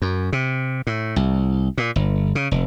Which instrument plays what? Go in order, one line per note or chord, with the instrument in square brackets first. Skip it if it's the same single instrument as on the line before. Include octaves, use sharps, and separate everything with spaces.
[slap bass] F#2
C3
A2
C2
A#2
G1
C#3
F1